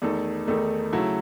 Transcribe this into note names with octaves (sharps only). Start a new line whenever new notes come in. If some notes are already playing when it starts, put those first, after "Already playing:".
E2 D#3 A3 D#4 A4
E2 D#3 A3 D#4 A4
C#3 F#3 A3 E4 A4